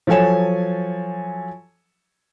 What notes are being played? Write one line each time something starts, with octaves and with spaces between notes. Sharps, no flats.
F3 F#3 A4 C#5 G#5 E7